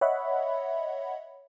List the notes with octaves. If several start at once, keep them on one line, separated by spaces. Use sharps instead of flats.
C#5 D#5 E5 F#5 B5